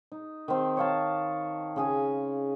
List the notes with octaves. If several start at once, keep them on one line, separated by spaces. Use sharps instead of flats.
D#4
D#3 C4
C#5 F5 A5
C#3 G#4 G#5